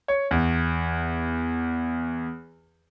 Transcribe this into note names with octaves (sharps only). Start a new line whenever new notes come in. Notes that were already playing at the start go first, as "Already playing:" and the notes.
C#5
E2